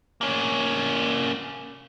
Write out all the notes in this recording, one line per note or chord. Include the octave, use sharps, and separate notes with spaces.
A#3 C#4